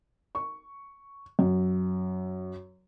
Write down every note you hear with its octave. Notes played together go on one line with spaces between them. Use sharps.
C#6
F#2